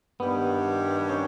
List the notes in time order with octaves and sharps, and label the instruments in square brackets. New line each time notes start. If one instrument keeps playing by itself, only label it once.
[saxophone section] G2 D#3 G3 [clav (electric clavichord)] B3
[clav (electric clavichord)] C#4